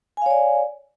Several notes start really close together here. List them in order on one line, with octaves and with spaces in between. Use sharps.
G#5 F5 C#5 D5